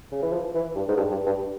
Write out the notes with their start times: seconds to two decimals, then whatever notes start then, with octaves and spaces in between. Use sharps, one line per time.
0.12 C#3
0.23 E3
0.33 F3
0.55 E3
0.76 G2
0.88 G#2
0.97 G2
1.11 G2
1.26 G2